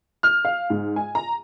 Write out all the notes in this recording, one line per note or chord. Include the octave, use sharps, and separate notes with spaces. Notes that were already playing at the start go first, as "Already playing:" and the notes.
F6
F5
G#2
G#5
A#5